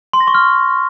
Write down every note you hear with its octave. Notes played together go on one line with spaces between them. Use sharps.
C6
A#6
C#6
F6